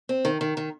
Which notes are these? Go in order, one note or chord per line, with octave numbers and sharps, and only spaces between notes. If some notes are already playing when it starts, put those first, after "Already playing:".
C4
D#3
D#3
D#3